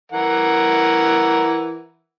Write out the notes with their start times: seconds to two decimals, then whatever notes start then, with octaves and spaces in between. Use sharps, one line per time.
0.12 E3 A#4 F#5